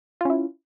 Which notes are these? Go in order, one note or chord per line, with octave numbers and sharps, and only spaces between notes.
C#4 E4 F4